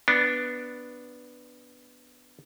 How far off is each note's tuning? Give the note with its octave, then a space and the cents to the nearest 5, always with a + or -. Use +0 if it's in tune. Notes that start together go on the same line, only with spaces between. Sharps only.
B3 +0 D4 +0